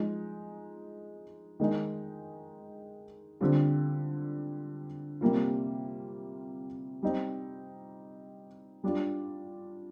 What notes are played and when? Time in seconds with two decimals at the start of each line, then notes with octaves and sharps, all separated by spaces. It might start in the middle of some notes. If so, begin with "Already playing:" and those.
Already playing: F3 G#3 D#4
1.60 D#3 G#3 D#4
3.41 D3 G3 C4 F4
5.21 C3 G3 A#3 F4
7.03 G3 C4 D#4
8.84 G3 D4 F4